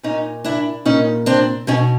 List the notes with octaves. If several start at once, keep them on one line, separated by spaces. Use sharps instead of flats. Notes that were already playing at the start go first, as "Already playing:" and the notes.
A#2 C#4 D#4
D4 E4
A#2 C#4 D#4
C4 D4
B2 C#4 D#4